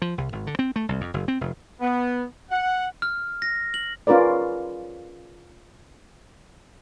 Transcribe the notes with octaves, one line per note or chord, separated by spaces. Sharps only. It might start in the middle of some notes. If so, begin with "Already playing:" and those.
F3
C2
G#1
D3
C4
A3
C2
F2
F#1
C4
F1
B3
F#5
F6
A#6
F#7
C#4 F4 A#4 B4 D5